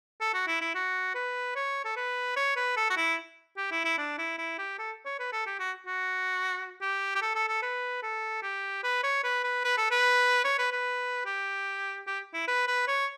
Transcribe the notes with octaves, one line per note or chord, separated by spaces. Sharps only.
A4
F#4
E4
E4
F#4
B4
C#5
A4
B4
C#5
B4
A4
F#4
E4
G4
E4
E4
D4
E4
E4
G4
A4
C#5
B4
A4
G4
F#4
F#4
G4
G4
A4
A4
A4
B4
A4
G4
B4
C#5
B4
B4
B4
A4
B4
C#5
B4
B4
G4
G4
E4
B4
B4
C#5